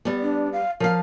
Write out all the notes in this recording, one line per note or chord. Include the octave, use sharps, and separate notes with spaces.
G3 B3
D4
F5
F3 A#4 F5